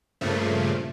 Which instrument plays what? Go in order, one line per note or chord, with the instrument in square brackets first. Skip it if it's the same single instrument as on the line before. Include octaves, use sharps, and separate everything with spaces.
[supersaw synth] G2 A#2 C#3 F3 A3